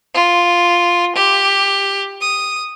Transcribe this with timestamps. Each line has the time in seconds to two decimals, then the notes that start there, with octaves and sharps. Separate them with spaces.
0.14 F4
1.15 G4
2.21 D#6